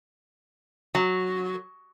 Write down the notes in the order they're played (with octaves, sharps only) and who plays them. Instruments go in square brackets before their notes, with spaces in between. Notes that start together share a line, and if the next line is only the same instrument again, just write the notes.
[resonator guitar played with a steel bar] F#3